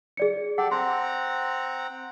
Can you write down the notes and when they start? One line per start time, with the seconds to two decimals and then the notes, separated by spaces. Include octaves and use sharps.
0.17 G#4 D5 C#7
0.58 G4 A4 D5 F#5
0.71 C4 F#5 A#5 C6